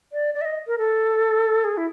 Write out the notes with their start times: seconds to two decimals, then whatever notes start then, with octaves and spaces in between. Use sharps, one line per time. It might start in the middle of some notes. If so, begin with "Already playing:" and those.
0.13 D5
0.35 D5
0.41 E5
0.45 D#5
0.67 A#4
0.78 A4
1.64 G#4
1.77 E4